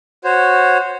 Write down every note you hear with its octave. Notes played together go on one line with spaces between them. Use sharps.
F#4 C5 C#5